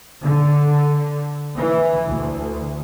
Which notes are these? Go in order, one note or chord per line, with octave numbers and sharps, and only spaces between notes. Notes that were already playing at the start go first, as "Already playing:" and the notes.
D3
E3
D2